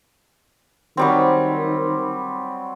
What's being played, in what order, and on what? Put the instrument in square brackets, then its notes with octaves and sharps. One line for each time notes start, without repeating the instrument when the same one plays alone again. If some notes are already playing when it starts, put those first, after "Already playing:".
[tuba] D#3 [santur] F#3 G3 C4